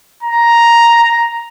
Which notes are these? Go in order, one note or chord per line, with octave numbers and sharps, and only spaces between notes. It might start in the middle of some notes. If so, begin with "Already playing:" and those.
A#5